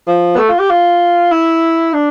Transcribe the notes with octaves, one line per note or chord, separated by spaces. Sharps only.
F3
B3
A3
F4
G4
F4
E4
D4